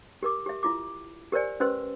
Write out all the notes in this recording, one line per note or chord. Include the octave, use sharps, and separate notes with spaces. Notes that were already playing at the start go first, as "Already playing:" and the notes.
G4 A#4 D6
G4 E5
E4 F4 D6
G4 A#4 C5 D5 G#5
C#4 G4 B4 C5 C6 E6